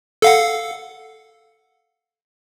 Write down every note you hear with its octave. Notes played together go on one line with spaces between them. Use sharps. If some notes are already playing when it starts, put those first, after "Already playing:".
A4 F5 F#5